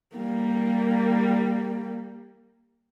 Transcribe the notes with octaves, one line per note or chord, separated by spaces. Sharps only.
G3 A#3